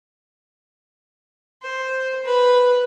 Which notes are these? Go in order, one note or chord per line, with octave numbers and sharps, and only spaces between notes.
C5
B4